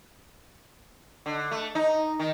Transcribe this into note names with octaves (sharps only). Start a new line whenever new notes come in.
D3
A3
D#4
D#3